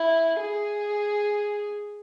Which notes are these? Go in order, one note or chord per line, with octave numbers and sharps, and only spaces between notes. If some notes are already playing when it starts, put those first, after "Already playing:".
Already playing: E4
G#4